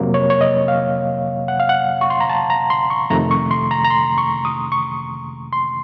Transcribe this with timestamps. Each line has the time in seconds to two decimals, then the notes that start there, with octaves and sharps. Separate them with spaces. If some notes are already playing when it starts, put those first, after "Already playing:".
Already playing: F2 C3 F#3 A#3
0.14 C#5
0.30 C#5
0.41 D#5
0.68 F5
1.48 F#5
1.60 F5
1.69 F#5
2.01 C#6
2.10 C6
2.20 A#5
2.30 A5
2.50 A#5
2.70 C6
2.90 C#6
3.10 F2 C3 D#3 A3 A#5
3.31 C#6
3.51 C6
3.71 A#5
3.85 A#5
3.90 C6
4.18 C#6
4.45 D#6
4.72 C#6
5.53 C6